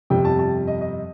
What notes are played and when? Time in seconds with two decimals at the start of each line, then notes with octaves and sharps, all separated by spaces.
0.10 G1 F2 C3 G3 G5
0.25 A5
0.39 A5
0.67 D#5
0.81 D#5